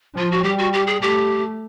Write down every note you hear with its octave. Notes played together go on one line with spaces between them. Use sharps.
F3 F4
F#4
G3 G4
F#4
G4
G#4
A3 G4